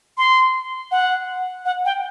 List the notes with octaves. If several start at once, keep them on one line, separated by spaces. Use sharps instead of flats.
C6
F#5
F#5
G5